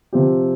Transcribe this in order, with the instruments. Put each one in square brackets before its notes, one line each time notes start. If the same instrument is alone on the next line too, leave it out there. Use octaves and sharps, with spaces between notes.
[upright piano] C3 F3 C4 G4